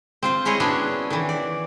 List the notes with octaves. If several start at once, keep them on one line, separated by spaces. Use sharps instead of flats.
C4 F4 C5
G#3 E4 G#4 C#5 D#5
B3 C#4 D4 E4 F#4 G#4
D#3 E3
D5